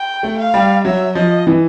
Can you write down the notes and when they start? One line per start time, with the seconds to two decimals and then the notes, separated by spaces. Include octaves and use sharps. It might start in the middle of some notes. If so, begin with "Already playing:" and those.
Already playing: G5
0.23 A3
0.39 F5
0.54 G3
0.85 F#3 E5
1.15 F3 D#5
1.47 E3